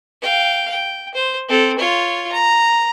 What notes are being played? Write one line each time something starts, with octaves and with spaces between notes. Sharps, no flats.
F5 G5
G5
C5
C4 A4
F4 C#5
A#5